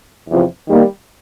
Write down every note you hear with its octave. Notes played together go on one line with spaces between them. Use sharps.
E2 C3 F3
D#3 G3 A#3